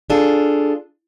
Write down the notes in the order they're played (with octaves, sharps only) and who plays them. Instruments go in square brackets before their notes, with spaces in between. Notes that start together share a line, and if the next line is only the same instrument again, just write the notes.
[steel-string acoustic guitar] D4 F4 G#4 A4